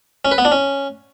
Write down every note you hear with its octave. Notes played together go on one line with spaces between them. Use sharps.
C#4
B4
B3
D4
C#4